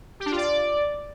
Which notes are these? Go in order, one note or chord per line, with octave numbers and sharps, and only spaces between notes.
G4
D4
F4
D5